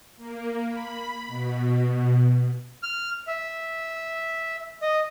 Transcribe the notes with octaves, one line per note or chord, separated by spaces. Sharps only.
A#3
B5
B2
F6
E5
D#5